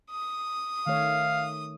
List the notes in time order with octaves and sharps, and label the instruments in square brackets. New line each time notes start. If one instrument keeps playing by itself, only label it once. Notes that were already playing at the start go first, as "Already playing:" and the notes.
[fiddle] D#6
[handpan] D#3 A3 C#5 [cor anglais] F5